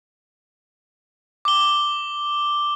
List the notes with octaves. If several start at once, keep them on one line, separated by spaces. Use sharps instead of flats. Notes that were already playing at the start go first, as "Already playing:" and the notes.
D6 G7